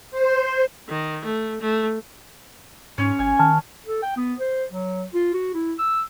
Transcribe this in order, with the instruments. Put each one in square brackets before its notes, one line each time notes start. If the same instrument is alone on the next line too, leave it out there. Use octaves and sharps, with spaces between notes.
[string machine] C5
[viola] D#3
A3
A3
[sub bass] G#2 [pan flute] C#4 [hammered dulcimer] C#5
[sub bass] G#1 [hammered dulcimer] G#5
[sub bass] D#3 [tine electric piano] A5 F6
[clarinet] A4
G5
B3
C5
F#3
F4
F#4
E4
E6